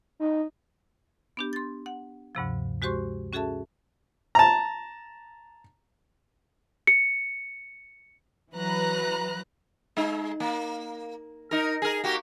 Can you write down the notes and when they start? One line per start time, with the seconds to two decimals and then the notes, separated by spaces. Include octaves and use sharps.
0.20 D#4
1.37 B3 D4 G4
1.53 C6 A6
1.86 F#5
2.35 D2 G2 C3 F3
2.82 G#3 F#4 G4 C5 C6 C#6
3.33 C#4 F#4 G#4 A4 E5 A5
4.35 A5 A#5
6.87 C#7
8.53 E3 F#3 B4 A#5 F#6
9.97 G#3 D#4
10.40 A#3
11.51 D#4 A#4
11.82 G#4 A#4
12.04 A#3 F#4 G4